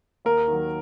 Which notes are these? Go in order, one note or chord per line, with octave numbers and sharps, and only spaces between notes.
D#2 A#4
D#3 F#3